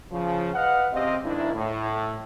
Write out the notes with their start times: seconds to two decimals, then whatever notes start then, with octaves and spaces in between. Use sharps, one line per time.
0.11 C#3 F3
0.54 B4 D#5 F5 F#5
0.92 C#2 C3 C4 G4 D#5 F5
1.24 C#2 G#2 D#3 D4 E4
1.54 A2